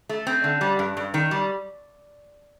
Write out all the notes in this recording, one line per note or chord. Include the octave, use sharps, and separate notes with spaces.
A3
C4
D3
G3
G2
G2
D#3
G3